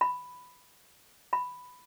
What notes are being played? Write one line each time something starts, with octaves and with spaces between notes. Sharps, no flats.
B5
B5